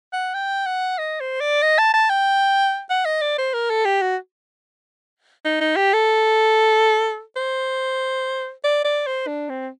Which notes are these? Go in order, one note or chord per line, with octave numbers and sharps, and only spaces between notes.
F#5
G5
F#5
D#5
C5
D5
D#5
A5
A5
G5
F#5
D#5
D5
C5
A#4
A4
G4
F#4
D#4
D#4
G4
A4
C5
D5
D5
C5
D4
C4